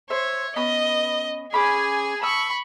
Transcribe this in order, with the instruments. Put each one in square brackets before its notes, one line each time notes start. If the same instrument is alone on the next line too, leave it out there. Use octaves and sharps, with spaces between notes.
[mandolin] C5 E5 [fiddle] C#5
[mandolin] B3 C#4 B5 [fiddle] D#5
[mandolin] C#4 B5 D6 [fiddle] G#4 G#5
[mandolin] A5 D#6 E6 [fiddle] B5 C#6